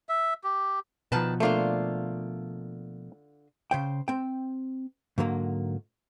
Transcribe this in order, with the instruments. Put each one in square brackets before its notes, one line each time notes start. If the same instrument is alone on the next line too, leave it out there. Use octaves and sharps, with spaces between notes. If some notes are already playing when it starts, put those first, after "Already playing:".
[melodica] E5
G4
[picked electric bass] B2 F3 [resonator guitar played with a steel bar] D#3 B4 A5
[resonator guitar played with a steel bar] D3 F4 C5 [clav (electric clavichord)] A3 A#3 D4
[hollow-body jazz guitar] C#3 C5 G5
C4 G5
G#2 D3 F#3 A#3